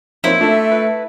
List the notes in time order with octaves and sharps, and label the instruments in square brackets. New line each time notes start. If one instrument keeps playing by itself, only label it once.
[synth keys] F3 C#5 [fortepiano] A#3 C4 D#4 [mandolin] E4
[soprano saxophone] A3 [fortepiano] D4 [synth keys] F4
[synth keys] B4